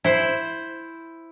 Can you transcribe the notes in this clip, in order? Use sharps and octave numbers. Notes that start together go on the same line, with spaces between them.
E4 C5